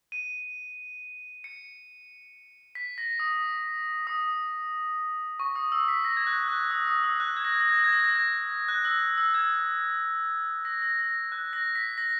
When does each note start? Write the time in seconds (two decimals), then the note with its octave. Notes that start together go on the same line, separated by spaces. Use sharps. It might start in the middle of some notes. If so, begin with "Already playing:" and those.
0.12 D#7
1.44 C#7
2.75 B6
2.98 A#6
3.20 D#6
4.07 D#6
5.40 C#6
5.56 D#6
5.72 E6
5.88 B6
6.05 A#6
6.17 G#6
6.27 F#6
6.48 F#6
6.71 D#6
6.87 D#6
7.03 E6
7.20 F#6
7.36 G#6
7.44 A#6
7.52 G#6
7.60 A#6
7.69 G#6
7.76 A#6
7.84 G#6
7.92 A#6
8.00 G#6
8.08 A#6
8.16 G#6
8.68 F#6
8.85 E6
9.18 E6
9.34 G#6
10.65 A#6
10.82 A#6
10.99 A#6
11.32 F#6
11.53 A#6
11.75 B6
11.98 A#6